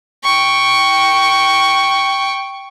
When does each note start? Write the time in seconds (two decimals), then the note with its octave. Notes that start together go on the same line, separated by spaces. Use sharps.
0.24 G5 C#6